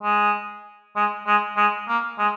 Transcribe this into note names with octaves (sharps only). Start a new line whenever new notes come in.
G#3
G#3
G#3
G#3
A#3
G#3